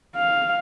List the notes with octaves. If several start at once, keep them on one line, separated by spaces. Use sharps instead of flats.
F5